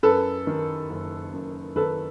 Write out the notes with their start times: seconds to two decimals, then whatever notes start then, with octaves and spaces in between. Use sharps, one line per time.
0.03 F#2 A4 B4
0.47 D#3
0.90 F#1
1.33 F#2
1.76 D#3 A4 B4